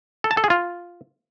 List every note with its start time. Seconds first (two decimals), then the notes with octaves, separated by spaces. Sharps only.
0.24 A4
0.31 A5
0.37 A4
0.44 G#4
0.50 F4